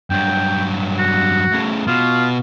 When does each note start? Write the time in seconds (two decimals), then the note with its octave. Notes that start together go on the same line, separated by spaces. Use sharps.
0.10 G2 F#3 G5
0.98 F#4
1.52 A2 C#3
1.87 B2 F4